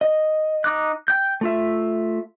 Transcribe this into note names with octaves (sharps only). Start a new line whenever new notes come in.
D#5
D#4 D6 F#6
G5 G6
A3 F4 E5